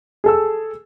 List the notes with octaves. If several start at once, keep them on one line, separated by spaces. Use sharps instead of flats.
G#4 A4 E6